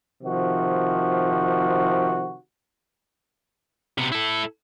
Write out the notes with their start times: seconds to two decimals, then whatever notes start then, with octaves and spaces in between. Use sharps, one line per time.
0.23 C3 D#3 F3 F#4
3.98 C3 B3
4.12 E4 A4